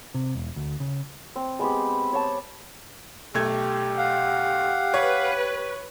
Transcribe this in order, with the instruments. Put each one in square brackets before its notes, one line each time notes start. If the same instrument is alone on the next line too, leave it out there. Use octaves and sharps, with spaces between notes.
[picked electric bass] C3
E1
D2
C#3
[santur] C4
G#3 B3 C4 G4
C#5 A5
[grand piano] B1 A3 G#6 [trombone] G4
[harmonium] F5 F#5
[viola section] B4 [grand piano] C#5